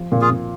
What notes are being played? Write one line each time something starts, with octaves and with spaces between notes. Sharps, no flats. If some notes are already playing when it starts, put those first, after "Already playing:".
Already playing: F3
A#2
F4 G#4
A#2